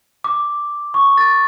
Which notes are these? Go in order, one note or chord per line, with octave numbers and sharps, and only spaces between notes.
D6
C#6
A6